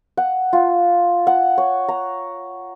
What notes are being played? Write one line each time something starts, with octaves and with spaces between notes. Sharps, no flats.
F#5
F4
F#5
C#5
A#5